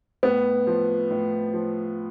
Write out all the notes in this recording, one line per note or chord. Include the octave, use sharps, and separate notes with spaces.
A2 B3
F3
A2
F3